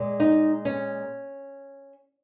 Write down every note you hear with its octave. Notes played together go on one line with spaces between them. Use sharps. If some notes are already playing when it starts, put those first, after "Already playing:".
Already playing: A#2 G#3
D#4
C#4